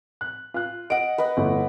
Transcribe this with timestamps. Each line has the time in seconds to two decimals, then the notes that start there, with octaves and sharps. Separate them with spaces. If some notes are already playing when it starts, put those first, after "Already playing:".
0.21 F#6
0.54 F4 F#6
0.90 D#5 F#5 D7
1.18 B4 D#5
1.37 G1 A3 E4